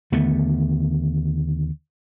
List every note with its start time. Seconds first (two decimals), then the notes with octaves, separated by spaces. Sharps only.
0.12 D#2 D3 A3 B3